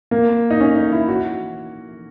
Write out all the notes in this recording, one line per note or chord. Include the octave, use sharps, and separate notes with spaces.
A#3
D#4
C#4
D#4
E4
F#4